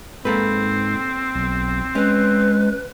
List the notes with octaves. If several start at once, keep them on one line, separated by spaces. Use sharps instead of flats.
G#2 A#3 C4 A4 B4
B1
G#3 C#4 B4